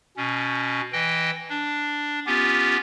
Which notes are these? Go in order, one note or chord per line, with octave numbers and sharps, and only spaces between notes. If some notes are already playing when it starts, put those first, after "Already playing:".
B2 C#4
E3 D#5 G5
D4
B3 C#4 F4 G4